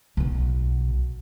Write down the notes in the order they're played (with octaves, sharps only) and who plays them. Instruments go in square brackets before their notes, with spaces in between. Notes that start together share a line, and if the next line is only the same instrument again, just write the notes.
[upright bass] B1 B2